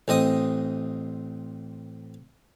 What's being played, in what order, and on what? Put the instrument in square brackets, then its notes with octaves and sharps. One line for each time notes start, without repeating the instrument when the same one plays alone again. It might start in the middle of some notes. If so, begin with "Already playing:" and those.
[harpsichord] A1 C4 D#5 D#6